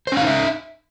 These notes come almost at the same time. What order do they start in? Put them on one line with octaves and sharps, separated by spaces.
C5 C#4 F5 D#4 E5